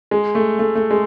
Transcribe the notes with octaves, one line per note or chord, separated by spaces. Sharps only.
G#3
A3
A3
A3
G#3